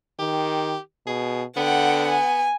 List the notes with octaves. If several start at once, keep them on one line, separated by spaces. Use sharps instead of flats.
D#3 G4
B2 G#4
D3 B3 F#5 G5
G#5